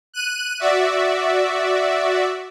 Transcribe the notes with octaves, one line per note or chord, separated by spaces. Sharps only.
F#6 D#7
F#4 D5 E5